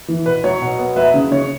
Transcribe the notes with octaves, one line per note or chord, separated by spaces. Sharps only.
E3
B2 B4
F#3 C#5
B2
B3
F#3 B4 E5
C#3
C#3 C#5